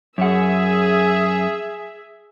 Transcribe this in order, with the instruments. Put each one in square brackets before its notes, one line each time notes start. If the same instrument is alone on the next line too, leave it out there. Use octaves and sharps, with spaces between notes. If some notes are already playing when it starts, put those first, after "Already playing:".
[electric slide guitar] F#2 F#5 [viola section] G#4 E5